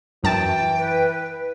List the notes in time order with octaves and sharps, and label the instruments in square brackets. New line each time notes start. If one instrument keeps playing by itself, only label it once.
[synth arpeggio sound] F#2 A5 A6 [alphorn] E3 [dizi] G5
[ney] B4